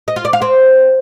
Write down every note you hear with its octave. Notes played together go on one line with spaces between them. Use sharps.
D#5
F4
D5
F5
C4